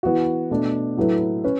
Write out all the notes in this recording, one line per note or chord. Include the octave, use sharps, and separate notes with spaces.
E3 B3 F#4
B2 A3 D4
A2 F#3 A3 E4 B4
C#4 B4